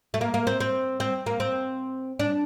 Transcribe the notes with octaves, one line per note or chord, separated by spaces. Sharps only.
A3
A#3
A#3
C4
C4
C4
A#3
C4
D4